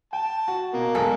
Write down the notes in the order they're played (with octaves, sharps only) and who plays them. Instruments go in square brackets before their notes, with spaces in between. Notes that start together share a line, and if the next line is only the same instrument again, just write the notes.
[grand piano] G5 [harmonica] A5
[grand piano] F#4
[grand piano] B2 [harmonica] A#3
[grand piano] B1 E2 D#5 [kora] G#3 A4